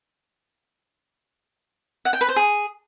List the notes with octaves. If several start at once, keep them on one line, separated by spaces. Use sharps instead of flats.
F#5
G5
B4
C5
G#4